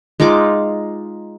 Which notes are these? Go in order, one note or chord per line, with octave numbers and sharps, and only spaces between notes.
G#3 D#4 F4 D6